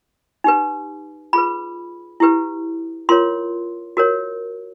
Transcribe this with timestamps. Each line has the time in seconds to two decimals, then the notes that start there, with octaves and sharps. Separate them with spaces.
0.44 D#4 G4 B4
1.33 F4 G#4 B4 B5
2.20 E4 G4 B4
3.09 F4 A#4 C#5 C6
3.97 F#4 A#4 C#5